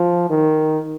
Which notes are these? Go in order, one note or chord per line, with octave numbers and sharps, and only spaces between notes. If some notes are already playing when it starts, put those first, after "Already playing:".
Already playing: F3
D#3